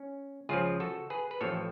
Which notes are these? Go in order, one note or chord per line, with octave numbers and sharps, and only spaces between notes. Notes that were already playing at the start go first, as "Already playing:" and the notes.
Already playing: C#4
C#2 C#3 F3 F4 G#4
F#4 A4
G#4 B4
B4
A1 A2 F3 A4 C#5